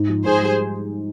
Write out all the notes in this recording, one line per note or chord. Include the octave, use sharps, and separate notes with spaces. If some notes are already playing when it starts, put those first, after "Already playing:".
Already playing: G#2
F3
G#2 G#4 C5
G3